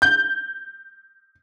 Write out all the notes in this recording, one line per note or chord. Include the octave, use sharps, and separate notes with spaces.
G6